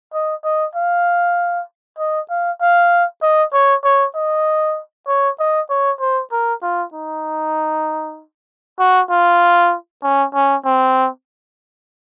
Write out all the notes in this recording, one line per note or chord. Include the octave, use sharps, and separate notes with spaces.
D#5
D#5
F5
D#5
F5
F5
D#5
C#5
C#5
D#5
C#5
D#5
C#5
C5
A#4
F4
D#4
F#4
F4
C#4
C#4
C4